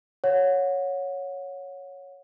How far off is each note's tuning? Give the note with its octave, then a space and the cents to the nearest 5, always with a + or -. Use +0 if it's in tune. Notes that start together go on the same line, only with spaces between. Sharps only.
C#5 +0 F#5 -25